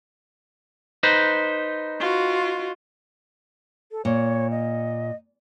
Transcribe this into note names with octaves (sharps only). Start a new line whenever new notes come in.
D#4 B4 C5
F4 F#4
A4
A#2 C#5
D#5